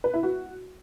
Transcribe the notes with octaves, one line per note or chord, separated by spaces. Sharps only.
B4
E4
F#4